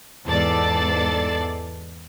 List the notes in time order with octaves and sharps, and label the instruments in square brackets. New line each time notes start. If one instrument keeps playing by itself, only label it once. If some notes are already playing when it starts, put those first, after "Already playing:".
[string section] E2 G#2 A4 D5 A6 C7